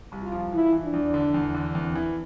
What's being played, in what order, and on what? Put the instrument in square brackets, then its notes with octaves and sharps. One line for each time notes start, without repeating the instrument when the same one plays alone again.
[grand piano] C2
[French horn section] F4
[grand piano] F3
[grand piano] E3 [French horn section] E4
[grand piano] E3
[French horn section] D4
[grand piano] E2
D3
E2
D3
[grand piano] E2 [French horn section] C4
[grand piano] E3